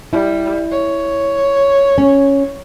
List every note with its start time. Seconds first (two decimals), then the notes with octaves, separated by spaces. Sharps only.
0.13 G3 E4
0.72 C#5
1.98 C#4